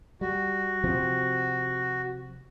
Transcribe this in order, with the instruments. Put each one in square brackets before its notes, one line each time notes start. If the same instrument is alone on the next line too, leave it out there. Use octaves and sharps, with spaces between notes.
[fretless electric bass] G3 [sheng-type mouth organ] F#4
[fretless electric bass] C3 F3 C4